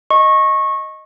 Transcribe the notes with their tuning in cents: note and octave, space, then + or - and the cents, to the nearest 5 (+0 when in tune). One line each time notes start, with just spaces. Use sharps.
D#5 +0 C#6 -20